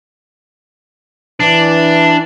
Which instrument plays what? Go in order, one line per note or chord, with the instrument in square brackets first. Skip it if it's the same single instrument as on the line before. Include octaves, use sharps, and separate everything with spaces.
[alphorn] E3 [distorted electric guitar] D4